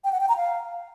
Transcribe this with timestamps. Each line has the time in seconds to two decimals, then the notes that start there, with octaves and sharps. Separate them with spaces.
0.04 G5
0.12 F#5
0.21 G5
0.29 A#5
0.37 F5